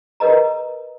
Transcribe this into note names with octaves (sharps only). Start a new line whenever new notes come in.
A#4 B4 D#5 A#5